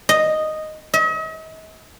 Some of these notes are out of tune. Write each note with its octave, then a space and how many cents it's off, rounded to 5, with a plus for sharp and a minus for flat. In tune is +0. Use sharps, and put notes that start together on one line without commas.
D#5 -5
D#5 +45